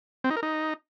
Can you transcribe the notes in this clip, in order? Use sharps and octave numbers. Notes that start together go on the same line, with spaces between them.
C4
D#4
A#4
D#4